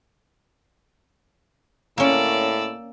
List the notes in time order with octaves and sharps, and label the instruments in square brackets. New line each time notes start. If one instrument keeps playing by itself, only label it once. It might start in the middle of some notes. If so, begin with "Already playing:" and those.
[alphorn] A2 [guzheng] A#3 C#4 [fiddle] D5 E6